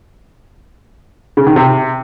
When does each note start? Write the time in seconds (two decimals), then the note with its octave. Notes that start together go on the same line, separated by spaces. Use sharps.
1.37 C#3
1.47 D#3
1.56 C3